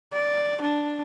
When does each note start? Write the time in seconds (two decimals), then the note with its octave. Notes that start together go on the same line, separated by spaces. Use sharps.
0.13 D5
0.61 D4